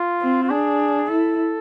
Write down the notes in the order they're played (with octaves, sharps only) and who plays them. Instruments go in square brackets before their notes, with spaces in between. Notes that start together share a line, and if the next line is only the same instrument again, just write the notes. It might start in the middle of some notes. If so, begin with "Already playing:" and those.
Already playing: [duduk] F4
[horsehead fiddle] C4
[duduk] F4
[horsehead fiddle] D4 [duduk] G#4
[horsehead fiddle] E4 [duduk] A4